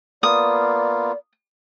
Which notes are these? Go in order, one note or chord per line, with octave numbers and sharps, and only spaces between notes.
A#3 B3 F4 D5 D#6